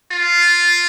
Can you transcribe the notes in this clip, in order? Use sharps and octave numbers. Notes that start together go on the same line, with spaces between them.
F4